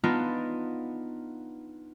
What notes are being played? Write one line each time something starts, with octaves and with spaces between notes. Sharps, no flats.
B3 D4 D#4 F4